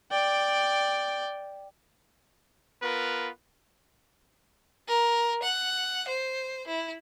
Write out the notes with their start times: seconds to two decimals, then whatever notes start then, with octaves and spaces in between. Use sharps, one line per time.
0.11 D5 G5
2.82 B3 F4 A#4 B4
4.88 A#4
5.42 F#5
6.08 C5
6.67 E4